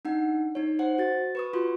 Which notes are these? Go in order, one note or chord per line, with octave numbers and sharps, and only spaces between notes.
D4 D#4 F#5
D#4 C#5
C5 F#5
F#4 A6
B4 C#6 D#6
F4 F#4 C6